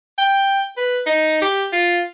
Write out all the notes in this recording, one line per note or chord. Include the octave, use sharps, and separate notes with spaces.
G5
B4
D#4
G4
F4